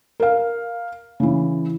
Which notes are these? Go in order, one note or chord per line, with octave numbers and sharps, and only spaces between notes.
A#4 F5
C#3 E3